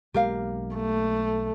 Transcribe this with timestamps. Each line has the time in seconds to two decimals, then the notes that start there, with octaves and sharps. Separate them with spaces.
0.14 B1 G#3 A#3 G4 A#4 F5
0.75 A3